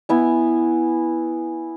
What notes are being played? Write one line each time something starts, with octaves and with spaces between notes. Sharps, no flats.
B3 E4 G#5